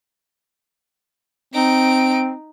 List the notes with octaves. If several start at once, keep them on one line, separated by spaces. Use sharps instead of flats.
C4 D#4 D7